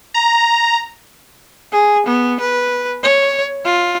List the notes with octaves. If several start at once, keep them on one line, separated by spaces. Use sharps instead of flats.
A#5
G#4
B3
B4
C#5
F4